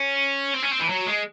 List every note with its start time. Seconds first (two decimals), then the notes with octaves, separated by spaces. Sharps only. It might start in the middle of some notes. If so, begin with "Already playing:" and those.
Already playing: C#4
0.54 C4
0.63 C#4
0.71 C4
0.80 E3
0.89 F#3
1.06 G#3